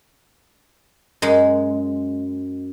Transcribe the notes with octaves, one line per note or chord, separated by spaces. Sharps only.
F#2 G#3